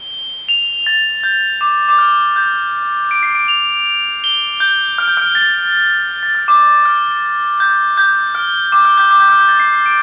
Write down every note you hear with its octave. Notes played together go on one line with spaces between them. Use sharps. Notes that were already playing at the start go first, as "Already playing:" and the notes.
Already playing: G7
F7
A6
G6
D6
D6
F6
G6
D7
C7
D7
F7
G7
G6
F6
G6
F6
A6
A6
F6
D6
F6
G6
G6
F6
D6
F6
G6
D6
G6
F6
G6
A6
C7
C7
D7